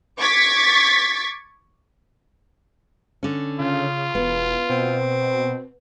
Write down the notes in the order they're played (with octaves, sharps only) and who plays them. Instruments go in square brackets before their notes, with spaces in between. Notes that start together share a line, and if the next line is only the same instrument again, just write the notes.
[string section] C#6 D6 G#6 A6 B6 C#7
[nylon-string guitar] D3 C#4
[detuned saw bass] C#3 [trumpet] F4
[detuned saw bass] E1 [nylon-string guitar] B3
[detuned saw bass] B2 [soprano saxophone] C4